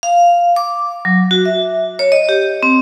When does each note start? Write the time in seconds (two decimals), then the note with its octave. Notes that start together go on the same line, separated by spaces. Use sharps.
0.03 F5
0.56 D6
1.05 F#3
1.31 F#4
1.45 E5
1.99 C#5
2.12 D#5
2.29 G4
2.63 C4